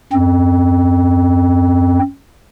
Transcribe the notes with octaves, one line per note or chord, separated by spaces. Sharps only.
F#2 C4